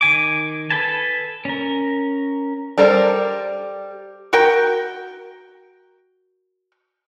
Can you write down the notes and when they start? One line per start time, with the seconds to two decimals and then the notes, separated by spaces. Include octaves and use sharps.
0.01 D#3 G#5 D6
0.70 A4 B4 G#5 A5
1.45 C#4 A#4
2.78 G3 A4 A#4 C5 D5
4.33 F#4 A#4 G5